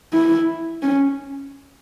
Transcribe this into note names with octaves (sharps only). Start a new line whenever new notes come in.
E4
C#4